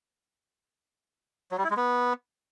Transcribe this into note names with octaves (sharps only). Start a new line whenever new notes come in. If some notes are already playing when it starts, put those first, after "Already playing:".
F#3
G3
E4
G#3
B3